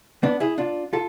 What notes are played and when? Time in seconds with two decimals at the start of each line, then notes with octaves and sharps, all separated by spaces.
0.23 B3 D4
0.40 E4 G#4
0.58 D4 F4
0.93 F4 A4